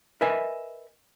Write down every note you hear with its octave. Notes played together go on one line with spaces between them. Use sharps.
A#4 B4 D#5 E5 G#5